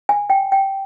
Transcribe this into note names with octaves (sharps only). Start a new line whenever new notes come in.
G#5
G5
G5